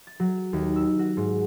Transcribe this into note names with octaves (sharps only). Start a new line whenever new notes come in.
A6
F#3
D#2
E6
F#4
G#2